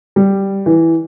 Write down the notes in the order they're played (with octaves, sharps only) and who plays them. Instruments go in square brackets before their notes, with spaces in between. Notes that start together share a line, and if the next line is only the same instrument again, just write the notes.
[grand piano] G3
E3